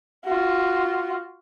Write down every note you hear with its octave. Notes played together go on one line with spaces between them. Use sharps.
F4 F#4